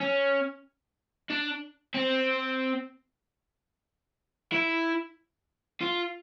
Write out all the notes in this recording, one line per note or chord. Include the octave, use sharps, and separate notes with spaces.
C#4
D4
C4
E4
F4